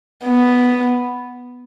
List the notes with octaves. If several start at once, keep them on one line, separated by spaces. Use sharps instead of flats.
B3